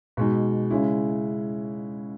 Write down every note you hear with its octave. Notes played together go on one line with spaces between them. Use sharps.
B2 G#3 D#4
C#3 G#3 C#4 E4